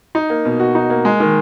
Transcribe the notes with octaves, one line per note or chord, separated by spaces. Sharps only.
D#4
A#3
B2
F#4
D#4
A#3
G#3
D#3